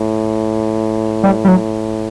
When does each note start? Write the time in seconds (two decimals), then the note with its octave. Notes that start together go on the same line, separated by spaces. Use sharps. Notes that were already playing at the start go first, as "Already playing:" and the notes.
Already playing: A2
1.23 G3
1.45 G3
1.48 F#3